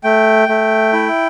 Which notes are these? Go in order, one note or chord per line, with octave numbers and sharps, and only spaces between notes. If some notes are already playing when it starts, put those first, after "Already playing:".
A3 G5
A3
E4